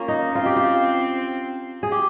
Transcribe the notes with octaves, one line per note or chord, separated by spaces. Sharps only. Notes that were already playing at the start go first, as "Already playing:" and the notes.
Already playing: A#3 C#4 F4
D#4
C4 F4
G4
F4
G#4
G4